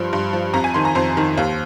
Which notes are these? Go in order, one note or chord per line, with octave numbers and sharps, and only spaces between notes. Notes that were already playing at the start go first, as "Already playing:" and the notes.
Already playing: G2 F3 C6
G2
F3
F2 A#5
G#5
D#3 C6
A#5
F2 C5
D#3
D#2